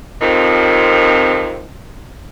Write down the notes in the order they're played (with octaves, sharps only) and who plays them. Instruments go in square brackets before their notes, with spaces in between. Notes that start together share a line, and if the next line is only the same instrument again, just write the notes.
[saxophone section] F2 C3 D#3 F3